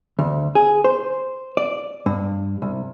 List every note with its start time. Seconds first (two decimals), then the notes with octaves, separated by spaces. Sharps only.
0.19 D2
0.55 G#4
0.84 C5
1.57 D5
2.06 G2
2.62 C2